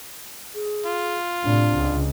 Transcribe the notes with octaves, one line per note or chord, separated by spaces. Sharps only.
G#4
F4
A2 C3 D4
C#2